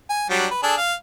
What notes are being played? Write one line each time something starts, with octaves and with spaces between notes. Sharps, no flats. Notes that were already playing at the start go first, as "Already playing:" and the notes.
G#5
F#3 G3 D4
B4
D4 G#4 A4
F5